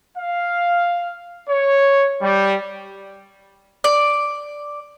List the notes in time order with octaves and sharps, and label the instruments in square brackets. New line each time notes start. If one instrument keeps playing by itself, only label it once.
[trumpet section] F5
C#5
G3
[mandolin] D5